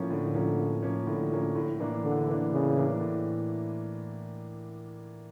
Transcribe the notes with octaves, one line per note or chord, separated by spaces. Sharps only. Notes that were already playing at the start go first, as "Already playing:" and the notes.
Already playing: A2 F3 A#3 C#4
A2 D3
F3 A#3 C#4
A2
F3 A#3 C#4
A2 D3
F3 A#3 C#4
A2
E3 A#3 D4
A2 D3
E3 A#3 D4
A2 C#3
E3 A#3 D4
A2